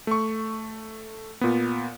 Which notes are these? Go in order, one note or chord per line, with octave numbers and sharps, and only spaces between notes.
A3 C#6
A#2 B3